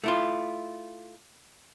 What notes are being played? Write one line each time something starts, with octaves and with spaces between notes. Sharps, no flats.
A3 E4 F4